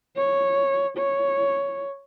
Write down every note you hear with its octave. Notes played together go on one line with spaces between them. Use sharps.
C#5
C#5